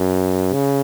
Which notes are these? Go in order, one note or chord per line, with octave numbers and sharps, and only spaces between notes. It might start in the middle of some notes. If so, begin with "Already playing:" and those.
Already playing: F#2
C#3